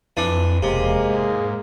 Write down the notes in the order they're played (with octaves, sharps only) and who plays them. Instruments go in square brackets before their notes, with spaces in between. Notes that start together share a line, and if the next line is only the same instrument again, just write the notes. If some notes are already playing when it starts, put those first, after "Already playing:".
[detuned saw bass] F2 [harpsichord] E3 D4
[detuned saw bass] E1 [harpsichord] C3 [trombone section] G#3 A#3
[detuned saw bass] G#2